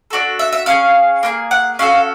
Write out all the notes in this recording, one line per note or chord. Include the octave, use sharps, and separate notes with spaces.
D4 F#4 A4
E5
E5
C#4 E4 G#4 F5
A#3 D#4 G#4
F#5
C#4 F#4 A4 F5